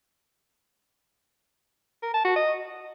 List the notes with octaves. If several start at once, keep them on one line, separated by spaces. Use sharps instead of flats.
A#4
A5
F#4
D#5